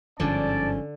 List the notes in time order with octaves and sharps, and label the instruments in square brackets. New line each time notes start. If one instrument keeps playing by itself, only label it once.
[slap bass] G1 G#2 F3 [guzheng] D3 [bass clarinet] C#4 [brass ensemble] D5 A5